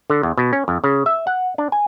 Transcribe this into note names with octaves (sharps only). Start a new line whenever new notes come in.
D3
E2
B2
C#4
F2
C#3
E5
F#5
D4
G#5